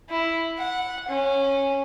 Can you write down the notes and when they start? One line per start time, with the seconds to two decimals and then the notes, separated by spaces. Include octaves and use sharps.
0.10 E4
0.58 F#5
1.08 C#4